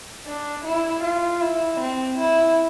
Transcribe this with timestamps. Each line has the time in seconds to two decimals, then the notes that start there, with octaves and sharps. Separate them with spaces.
0.26 D4
0.65 E4
1.03 F4
1.41 E4
1.80 C4
2.18 E4